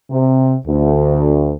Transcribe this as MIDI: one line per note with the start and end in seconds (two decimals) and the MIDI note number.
0.11 0.56 48
0.67 1.52 38